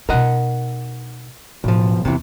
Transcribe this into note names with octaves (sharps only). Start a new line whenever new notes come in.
B2 D#4 A#4 D#5 F#5
B1 A2 F3
E2 C3 E3